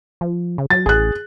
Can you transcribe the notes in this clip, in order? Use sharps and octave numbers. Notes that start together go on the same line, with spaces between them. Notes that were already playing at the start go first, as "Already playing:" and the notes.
F3
C#3
F#3 A6
A1 G#4 F#6